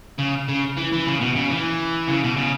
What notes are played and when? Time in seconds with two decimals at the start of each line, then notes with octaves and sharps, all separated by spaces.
0.19 C#3
0.49 C#3
0.77 E3
0.93 E3
1.07 C#3
1.21 B2
1.36 C#3
1.50 E3
2.07 C#3
2.23 B2
2.36 C#3